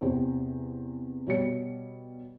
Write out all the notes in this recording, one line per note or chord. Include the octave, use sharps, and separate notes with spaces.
E2 C3 G4 C5
B2 G3 C#5 C#7